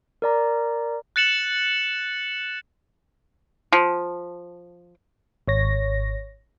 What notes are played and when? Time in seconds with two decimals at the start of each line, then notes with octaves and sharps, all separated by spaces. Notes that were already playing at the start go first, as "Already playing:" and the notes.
0.22 A#4 D5 A#5
1.16 F#6 A6 C#7 E7 F#7
3.73 F3
5.48 G#1 C#5 A#6